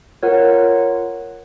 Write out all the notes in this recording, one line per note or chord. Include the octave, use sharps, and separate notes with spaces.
F4 A#4 C#5 F#5